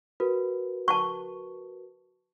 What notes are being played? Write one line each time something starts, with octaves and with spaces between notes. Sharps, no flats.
F#4 A#4 B4
A5 C#6